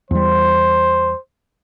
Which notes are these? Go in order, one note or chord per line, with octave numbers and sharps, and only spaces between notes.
E2 G3 C5